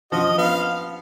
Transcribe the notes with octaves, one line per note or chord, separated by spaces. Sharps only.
F3 F#4 D#5
B3 F5